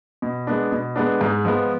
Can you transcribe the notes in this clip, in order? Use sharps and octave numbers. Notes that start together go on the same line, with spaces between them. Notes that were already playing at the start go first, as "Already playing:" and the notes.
B2
G#3 B3 D4
B2
G#3 B3 D4
G#2
F3 G#3 B3